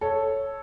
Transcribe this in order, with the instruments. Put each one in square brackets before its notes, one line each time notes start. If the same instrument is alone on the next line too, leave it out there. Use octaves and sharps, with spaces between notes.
[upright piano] A4 C#5